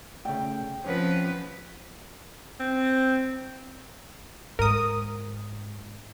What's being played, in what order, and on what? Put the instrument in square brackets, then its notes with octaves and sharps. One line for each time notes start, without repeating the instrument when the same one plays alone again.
[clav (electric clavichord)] C#3 A3 [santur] G5
[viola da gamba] F3 B4 [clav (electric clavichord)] C4 C#4 F#5
[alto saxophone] C4
[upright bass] G#2 [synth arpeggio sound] A#4 D#6